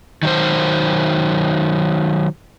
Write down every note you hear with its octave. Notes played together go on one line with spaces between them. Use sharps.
D#3 F#3 C5